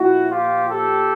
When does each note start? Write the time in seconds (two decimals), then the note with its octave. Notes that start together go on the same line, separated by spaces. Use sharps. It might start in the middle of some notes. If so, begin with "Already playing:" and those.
Already playing: A#2 F3 E4 F#4
0.29 F4 G4
0.68 G4 A4